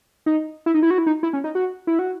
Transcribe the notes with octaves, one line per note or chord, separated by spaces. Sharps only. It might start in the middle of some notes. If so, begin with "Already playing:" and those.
D#4
E4
D#4
E4
F#4
E4
D#4
E4
C#4
D#4
F#4
E4
F#4